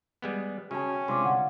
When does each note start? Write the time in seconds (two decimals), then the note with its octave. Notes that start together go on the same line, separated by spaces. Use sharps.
0.22 G3 G#3 B3
0.71 C#3 C#4 F#4 E5 G5 A5
1.08 C3 G#3 D4 F4 C6 D6
1.25 D3 F#5